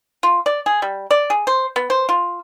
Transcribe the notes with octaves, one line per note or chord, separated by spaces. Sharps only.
F4
D5
G#4
G3
D5
G#4
C5
B3
C5
F4